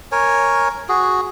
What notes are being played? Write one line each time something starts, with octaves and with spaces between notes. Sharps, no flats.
A#4 C#5 G#5
F#4 G#4